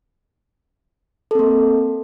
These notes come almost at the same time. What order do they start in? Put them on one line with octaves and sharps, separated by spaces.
A4 C4 A#3